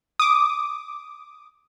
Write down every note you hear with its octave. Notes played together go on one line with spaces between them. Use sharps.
D6 D#6